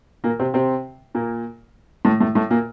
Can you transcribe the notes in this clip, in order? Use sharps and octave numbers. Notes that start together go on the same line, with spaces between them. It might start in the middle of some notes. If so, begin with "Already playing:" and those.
A#2 A#3
C3 C4
C3 C4
A#2 A#3
A2 A3
A2 A3
A2 A3
A#2 A#3